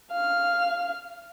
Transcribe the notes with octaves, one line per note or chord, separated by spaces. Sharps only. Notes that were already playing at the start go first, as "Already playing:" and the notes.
F5 F6